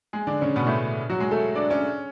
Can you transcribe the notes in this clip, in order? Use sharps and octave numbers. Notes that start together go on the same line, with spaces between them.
G#3 G#4
D3 D4
C#3 C#4
B2 B3
A2 A3
F#3 F#4
G#3 G#4
A3 A4
D4 D5
C#4 C#5